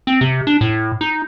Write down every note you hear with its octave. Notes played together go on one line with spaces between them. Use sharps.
C4
C3
D4
A2
D#4